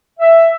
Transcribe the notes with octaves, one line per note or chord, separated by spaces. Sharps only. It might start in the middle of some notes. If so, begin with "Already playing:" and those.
E5